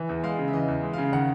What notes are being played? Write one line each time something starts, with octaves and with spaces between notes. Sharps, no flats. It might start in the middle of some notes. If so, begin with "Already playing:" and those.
Already playing: E3
E2
G#3 F5
C#3
E5
E3 D#5
E2
G#3
F5
C#3
D#3 F#5